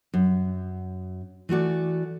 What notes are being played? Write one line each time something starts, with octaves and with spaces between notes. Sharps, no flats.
F#2
E3 A3 F#4 D5